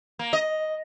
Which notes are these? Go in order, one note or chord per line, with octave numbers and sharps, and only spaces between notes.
A#3
D#5